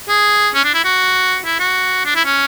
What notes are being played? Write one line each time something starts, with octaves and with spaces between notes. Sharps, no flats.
G#4
C#4
D4
E4
F#4
E4
F#4
D4
E4
C#4